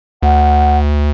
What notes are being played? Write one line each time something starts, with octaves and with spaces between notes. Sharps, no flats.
D2 F#5